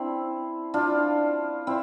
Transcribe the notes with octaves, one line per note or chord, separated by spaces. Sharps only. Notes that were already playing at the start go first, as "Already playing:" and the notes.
Already playing: C4 D4 E4
D4 F4
C4 E4